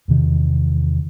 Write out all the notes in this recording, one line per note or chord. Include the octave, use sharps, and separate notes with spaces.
E2 C3 D#3